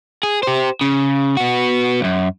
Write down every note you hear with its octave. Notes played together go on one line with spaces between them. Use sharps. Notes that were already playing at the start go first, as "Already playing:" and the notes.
G#4
G4 C5
C#3
B3 F#4
C#2 F#2